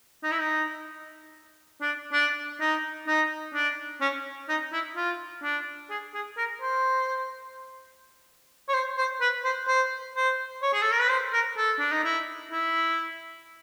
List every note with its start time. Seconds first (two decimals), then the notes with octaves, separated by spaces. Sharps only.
0.23 D#4
0.31 E4
0.39 D#4
1.82 D4
2.13 D4
2.60 D#4
3.07 D#4
3.54 D4
4.01 C#4
4.49 D#4
4.72 E4
4.96 F4
5.43 D4
5.90 G#4
6.14 G#4
6.37 A#4
6.62 C5
8.69 C#5
8.74 C5
8.98 C5
9.21 B4
9.44 C5
9.68 C5
10.15 C5
10.62 C#5
10.73 G#4
10.82 A4
10.92 A#4
11.00 B4
11.10 C5
11.33 A#4
11.57 A4
11.79 D4
11.92 D#4
12.04 E4
12.51 E4